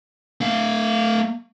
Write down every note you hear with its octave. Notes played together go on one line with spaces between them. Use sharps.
A3 F5